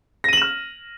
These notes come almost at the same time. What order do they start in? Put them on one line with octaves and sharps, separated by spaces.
A#6 D#7 F#7 E7 F6